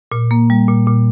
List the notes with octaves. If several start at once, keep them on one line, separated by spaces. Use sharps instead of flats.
A#2
A#3
G3
A#2
A#2